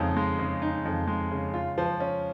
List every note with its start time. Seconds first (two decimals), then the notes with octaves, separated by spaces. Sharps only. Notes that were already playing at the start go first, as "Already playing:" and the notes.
Already playing: F2 C#3 G#3 D#4
0.17 G#3
0.39 C#3
0.62 D#4
0.85 F2
1.08 G#3
1.32 C#3
1.54 F4
1.78 F3
2.00 C#4